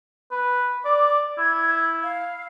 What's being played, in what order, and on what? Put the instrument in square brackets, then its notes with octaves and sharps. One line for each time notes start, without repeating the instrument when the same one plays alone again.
[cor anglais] B4
[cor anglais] D5 [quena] D6
[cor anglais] E4 [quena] G#6
[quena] F5